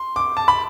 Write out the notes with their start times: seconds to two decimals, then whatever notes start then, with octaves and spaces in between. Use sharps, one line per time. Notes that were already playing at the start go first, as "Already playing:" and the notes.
Already playing: C6
0.16 D6
0.37 A5
0.48 B5